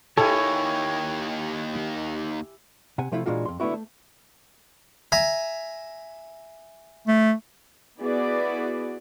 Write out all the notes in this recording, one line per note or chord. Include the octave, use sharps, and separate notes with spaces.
D#2 D#3 E4 G4 A4 C#5 G#5
C3 F#5 G#5
C3 F3 A3 E4 F4
A#2 E3 G#3 D4 F4 F#4
F2 C6
D3 A3 B3 E4 F#4
A3
E5 G#5 A#5
A3
B3 E4 F#4 G#4 D5